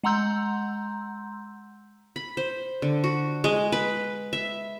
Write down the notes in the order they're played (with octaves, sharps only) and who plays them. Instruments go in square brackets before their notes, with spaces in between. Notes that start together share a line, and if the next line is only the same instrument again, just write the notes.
[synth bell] G#3 F#5 A#5 C6 E6 G6
[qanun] B5
C5
D3
F#4
G#3
B4
E5